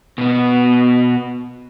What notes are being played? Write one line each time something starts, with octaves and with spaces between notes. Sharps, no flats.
B2 B3